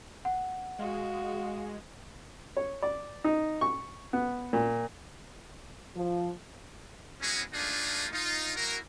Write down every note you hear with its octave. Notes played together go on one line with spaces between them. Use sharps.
F#5
G#3 F#4 F5
C#5
D5
D#4
C#6
B3
A#2
F3
G#3 B3 C#4 E4 F#4 G#4
A3 A#3 D4 D#4 F4 G#4
D#4 F4
A#3 E4 F#4 A#4